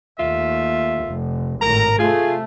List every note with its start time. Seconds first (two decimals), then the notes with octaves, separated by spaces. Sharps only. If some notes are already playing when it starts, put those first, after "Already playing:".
0.19 D#2 A3 F4 E5
1.05 F1
1.61 G#1 A2 A#4 A#5
1.99 C3 A3 F4 G#4